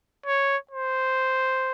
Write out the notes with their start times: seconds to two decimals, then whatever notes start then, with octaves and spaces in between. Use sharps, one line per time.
0.26 C#5
0.71 C5